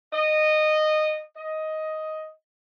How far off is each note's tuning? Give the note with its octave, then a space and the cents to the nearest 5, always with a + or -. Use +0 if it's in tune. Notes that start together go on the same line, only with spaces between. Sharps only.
D#5 -15
D#5 +10